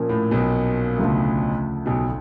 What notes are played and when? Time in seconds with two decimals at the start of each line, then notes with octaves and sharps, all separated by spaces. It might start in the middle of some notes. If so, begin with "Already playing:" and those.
Already playing: A#2 F3 A#3 C#4
0.09 A2
0.31 B1 B2
0.98 D2 C#3 F3 A3
1.86 B1 B2